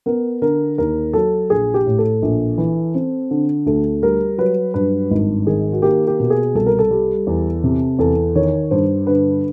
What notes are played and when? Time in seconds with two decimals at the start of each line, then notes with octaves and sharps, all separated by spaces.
0.06 B3 A#4
0.42 D3 A#4
0.78 D#2 A#4
1.13 F#3 A4
1.50 A#1 G#4
1.74 G4
1.86 A2
1.98 A4
2.22 A#1
2.58 E3
2.95 C4
3.31 D3
3.66 D2 A4
4.02 G3 A#4
4.38 F#3 B4
4.74 G2 B4
5.11 G#1
5.47 D#3 G#4
5.72 F#4
5.82 A#3 G4
6.07 G4
6.19 B2
6.30 G#4
6.55 C2 A4
6.66 A#4
6.79 A4
6.91 G3
7.27 E2
7.64 C3
7.99 E2 A4
8.35 D#3 C#5
8.71 G2 C5
9.07 D3 B4